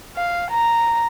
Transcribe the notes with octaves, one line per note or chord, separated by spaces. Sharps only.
F5
A#5